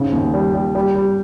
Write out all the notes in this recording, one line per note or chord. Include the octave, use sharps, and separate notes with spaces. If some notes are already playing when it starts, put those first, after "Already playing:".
Already playing: G#2 C#3
D#2
G3
G3
G3
G3